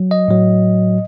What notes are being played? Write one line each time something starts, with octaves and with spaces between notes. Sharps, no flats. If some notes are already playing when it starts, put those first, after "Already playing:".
Already playing: F#3
D#5
A2 F#3